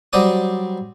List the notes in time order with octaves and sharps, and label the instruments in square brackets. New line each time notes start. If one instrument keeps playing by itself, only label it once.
[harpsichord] F#3 G3 C4 D5 D#6